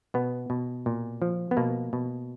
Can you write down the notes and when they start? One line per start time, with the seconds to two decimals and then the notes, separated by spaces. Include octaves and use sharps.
0.14 B2 B3
0.50 B2
0.86 A#2
1.22 F3
1.51 B3
1.57 B2 A#3
1.93 B2